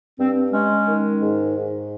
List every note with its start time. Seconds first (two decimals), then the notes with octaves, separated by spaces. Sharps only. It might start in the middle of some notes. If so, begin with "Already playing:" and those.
0.18 G2 C4
0.52 G#3 C#4
0.87 D#3
1.21 G#2
1.56 G#2